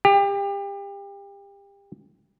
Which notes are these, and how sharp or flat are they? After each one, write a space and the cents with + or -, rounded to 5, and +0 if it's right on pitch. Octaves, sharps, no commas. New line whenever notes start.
G4 +30